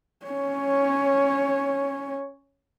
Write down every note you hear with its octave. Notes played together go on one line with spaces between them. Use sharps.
C#4 C#5